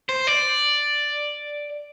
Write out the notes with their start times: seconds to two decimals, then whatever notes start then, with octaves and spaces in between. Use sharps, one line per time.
0.09 C5
0.27 D5